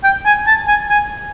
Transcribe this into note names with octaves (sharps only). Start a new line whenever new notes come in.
G5
G#5
A5
G#5
G#5